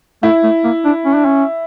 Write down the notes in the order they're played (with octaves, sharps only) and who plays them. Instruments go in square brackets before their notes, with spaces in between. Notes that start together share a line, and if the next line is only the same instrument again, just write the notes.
[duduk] A3 [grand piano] E4
[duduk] A3
A#3
D4
C#4
D4
C#4